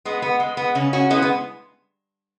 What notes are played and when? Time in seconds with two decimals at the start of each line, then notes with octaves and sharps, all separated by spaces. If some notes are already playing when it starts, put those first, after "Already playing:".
0.05 G#3 B3
0.22 B3
0.40 G#3
0.57 B3
0.75 C#3 C#4
0.93 C#4 F#4
1.10 G#3 B3 E4
1.22 B3